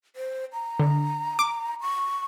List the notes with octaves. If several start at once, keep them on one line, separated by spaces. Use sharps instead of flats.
C5
A#5
D3
D6
C#6